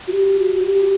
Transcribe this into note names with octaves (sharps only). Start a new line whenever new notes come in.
F#4
G4
F#4
F#4
G4